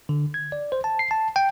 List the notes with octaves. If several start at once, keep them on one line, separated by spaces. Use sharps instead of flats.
D3
G#6
D5
C5
A5
C7
A5
G5